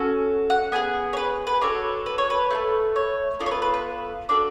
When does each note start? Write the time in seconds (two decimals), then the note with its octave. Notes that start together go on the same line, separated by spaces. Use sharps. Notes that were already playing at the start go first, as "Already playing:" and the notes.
Already playing: C#4 F#4 A4
0.50 F#5
0.72 B3 D4 G#4 G#5
1.13 C#5
1.17 B4
1.47 B4
1.61 D4 F#4 A4 C#5
2.06 B4
2.18 C#5
2.30 B4
2.51 A3 F4 A4
2.96 C#5
3.39 B3 F4 A4 D5
3.46 C#5
3.51 B4
3.62 B4
3.74 B4
4.29 D4 F#4 A4 D5